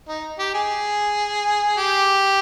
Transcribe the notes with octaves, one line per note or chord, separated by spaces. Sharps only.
D#4
G4
G#4
G4